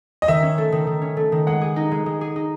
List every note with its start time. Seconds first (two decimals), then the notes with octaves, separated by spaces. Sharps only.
0.22 D#5
0.28 D#3 E5
0.42 C#4
0.58 A3
0.72 D#3
0.87 D#3
1.02 C#4
1.17 A3
1.32 D#3
1.47 G#3 F#5
1.61 G#4
1.76 D#4
1.92 G#3
2.06 G#3
2.21 G#4
2.36 D#4